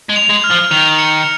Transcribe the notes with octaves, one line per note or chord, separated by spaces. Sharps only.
G#3
F7
G#3
F6
F3
D#3 F7
C#7